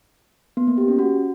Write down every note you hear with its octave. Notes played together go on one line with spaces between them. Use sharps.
B3
A#3
G4
C#4
F#4